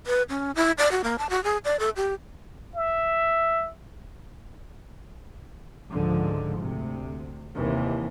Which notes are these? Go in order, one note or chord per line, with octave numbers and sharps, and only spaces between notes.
B4
C#4
E4
D5
F#4
A#3
A5
F#4
G#4
D5
A4
G4
E5
C#2 G#2 D3 F3
D2 C3
D#2 C3 D#3 E3